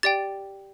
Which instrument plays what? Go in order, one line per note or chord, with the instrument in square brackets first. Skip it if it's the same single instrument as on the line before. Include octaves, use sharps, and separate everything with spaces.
[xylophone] G4 D5 G5 A6